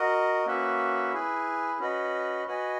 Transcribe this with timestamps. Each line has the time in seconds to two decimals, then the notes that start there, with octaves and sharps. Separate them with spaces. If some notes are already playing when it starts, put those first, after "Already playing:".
Already playing: F#4 A#4 D#5
0.46 A#3 C#4 F#4 B4 E5
1.13 E4 G#4 B4
1.79 C#4 F#4 B4 D#5
2.47 F#4 B4 D#5 G#5